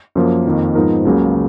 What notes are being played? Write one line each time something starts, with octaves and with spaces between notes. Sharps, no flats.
F#2 F3 A#3
F2 D#3 A#3
G#2 F3 B3 D#4 A#4
C#2 C#3 F#3 A#3